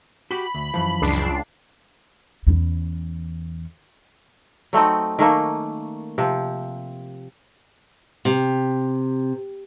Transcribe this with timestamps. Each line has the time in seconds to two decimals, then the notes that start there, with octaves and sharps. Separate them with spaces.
0.31 F#4 G4 B5
0.55 D2
0.74 F#2 E3 F3
1.02 C#2 D4 C7
2.47 E2 C#4
4.73 F#3 A3 C4 D#4
5.19 D#3 A3 A#3 C#4
6.18 C3 F3
8.25 C3